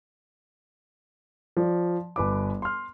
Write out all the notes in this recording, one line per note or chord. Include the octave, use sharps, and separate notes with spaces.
F3 D5
G1 B4 D6
C6 F6